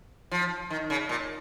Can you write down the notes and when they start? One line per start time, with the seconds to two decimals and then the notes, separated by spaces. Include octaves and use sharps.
0.31 F3
0.70 D#3
0.90 C#3
1.09 A#2